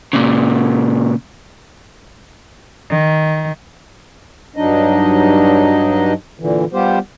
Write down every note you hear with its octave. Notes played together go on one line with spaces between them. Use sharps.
A#2 C#3
D#3
G2 F#3 D4 D#4 D#5
A#2 D3 E3
G3 B3 F4 G4 C5